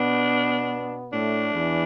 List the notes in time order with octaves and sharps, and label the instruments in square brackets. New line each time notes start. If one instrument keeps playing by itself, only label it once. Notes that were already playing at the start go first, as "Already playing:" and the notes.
Already playing: [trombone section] B2 B3 [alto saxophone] D4
[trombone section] A2 A3 [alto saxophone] D4
[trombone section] E2 E3